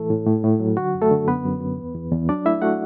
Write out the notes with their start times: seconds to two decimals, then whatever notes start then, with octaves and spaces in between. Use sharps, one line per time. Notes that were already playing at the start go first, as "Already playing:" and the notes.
Already playing: A2 E3 A3 A4
0.10 A2
0.26 A2
0.43 A2
0.60 F#3
0.77 D3 F#4
0.94 F#2
1.02 A3 A4
1.11 D3
1.28 F#2 B3 B4
1.45 F#2
1.61 F#2
1.78 E2
1.95 E2
2.12 E2
2.29 F#3 D4 D5
2.45 A3 E4 E5
2.62 A3 F#4 F#5